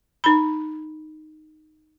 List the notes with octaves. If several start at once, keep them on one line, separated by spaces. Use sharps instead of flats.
D#4 B5